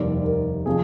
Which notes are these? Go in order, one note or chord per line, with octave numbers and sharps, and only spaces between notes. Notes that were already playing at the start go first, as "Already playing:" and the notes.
Already playing: F1 D#2 D#3 G3 D5
A#4
C3 F3 G#4